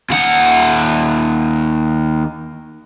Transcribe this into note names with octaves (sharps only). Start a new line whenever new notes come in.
D#2 F#5